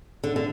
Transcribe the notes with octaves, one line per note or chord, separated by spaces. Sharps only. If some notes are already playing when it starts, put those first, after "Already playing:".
D3
D3